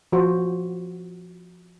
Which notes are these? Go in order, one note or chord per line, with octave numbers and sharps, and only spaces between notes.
F3 F#4 C5